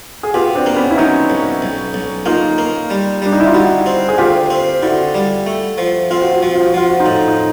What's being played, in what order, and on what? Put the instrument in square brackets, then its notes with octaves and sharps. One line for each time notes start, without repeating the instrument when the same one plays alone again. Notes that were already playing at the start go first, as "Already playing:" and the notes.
[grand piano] G#4
[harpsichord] B2 [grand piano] F4 G4
[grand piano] C4 D4
[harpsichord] A#3
[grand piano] B3 C#4
E4
[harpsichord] F#3 [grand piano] C#4 D#4
[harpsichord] B1
B1
B1
[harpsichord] A#3 [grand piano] D#4 F4
[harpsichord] A#3
G3
[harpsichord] G3 [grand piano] D4
[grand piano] D#4
E4
F4
[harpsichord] G3 [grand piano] E4 F#4
[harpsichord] C4
[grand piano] G#4
[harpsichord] D2 [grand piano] F4 G4
[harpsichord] C4
[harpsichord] D3 [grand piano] E4 F#4
[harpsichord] G3
A3
F3
[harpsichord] C4 [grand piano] F4
[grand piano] F#4
F4
[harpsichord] F3 [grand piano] F#4
[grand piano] F4
F#4
[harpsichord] F3 [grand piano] F4
[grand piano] F#4
D#4 F4
[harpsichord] A2
[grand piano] D#4